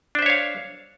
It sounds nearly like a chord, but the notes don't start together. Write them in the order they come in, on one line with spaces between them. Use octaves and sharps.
D4 C5 E5 C#5 F5